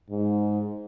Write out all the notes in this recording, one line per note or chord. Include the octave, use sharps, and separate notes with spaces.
G#2